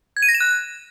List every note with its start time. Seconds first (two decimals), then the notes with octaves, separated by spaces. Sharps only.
0.17 G#6
0.23 D#7
0.29 A#6
0.34 E7
0.40 F#6